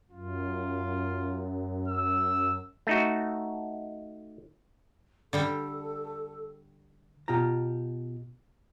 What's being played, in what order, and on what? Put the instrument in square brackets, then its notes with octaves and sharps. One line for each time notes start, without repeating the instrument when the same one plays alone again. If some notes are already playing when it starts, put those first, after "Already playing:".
[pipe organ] F#2 [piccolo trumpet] F4
[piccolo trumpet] E6
[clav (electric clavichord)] A3 D#4 F#4
[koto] D3 G3 G5 [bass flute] A4
[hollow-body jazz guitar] B2 F4 G4 A#5